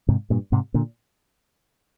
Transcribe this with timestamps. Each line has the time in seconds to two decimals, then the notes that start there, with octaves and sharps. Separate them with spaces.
0.09 G#2 C3
0.30 G2 A#2
0.52 G#2 C3
0.74 A#2 D3